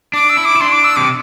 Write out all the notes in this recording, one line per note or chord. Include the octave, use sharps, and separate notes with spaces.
D4 D6
E6
E4
D6
E4
D4 C6
D6
E6
C3 D6